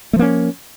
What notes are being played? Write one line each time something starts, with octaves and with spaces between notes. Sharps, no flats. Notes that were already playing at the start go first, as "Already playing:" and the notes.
F3 A3 A#3 C#4